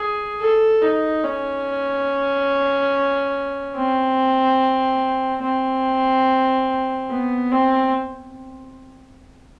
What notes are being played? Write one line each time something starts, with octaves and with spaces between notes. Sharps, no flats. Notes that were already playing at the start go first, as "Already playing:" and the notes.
Already playing: G#4
A4
D#4
C#4
C4
C4
B3
C4